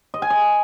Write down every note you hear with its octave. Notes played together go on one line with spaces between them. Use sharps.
D#5
G#5
D#5